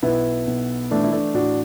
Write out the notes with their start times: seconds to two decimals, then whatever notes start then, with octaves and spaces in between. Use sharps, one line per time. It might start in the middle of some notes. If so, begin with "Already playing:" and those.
0.03 B1 B3 E4
0.47 B1
0.91 E3 A3 D4
1.04 E4
1.12 A3 D4
1.34 A2 D4 F#4